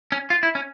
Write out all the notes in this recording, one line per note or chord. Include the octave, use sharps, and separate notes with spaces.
C#4
F4
E4
C#4